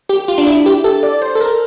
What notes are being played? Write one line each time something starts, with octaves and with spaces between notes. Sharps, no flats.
G4
F4
D4
E4
G4
A4
D5
C5
A4
A#4